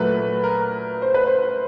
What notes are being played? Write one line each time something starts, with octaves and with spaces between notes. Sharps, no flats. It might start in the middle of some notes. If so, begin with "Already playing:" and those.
Already playing: A#2 F#3 A3 B4
A#4
C5
B4
C5